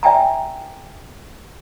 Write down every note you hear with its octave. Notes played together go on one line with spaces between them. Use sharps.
D5 E5 G5 G#5 A#5